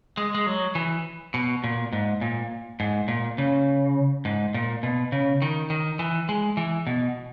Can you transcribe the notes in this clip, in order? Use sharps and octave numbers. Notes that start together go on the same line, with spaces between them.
G#3
G#3
F#3
E3
B2
A#2
G#2
A#2
G#2
A#2
C#3
G#2
A#2
B2
C#3
D#3
D#3
E3
G#3
E3
B2